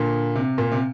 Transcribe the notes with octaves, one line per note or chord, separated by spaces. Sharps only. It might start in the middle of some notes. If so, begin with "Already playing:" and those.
Already playing: A#2 D3
C3
A#2
C3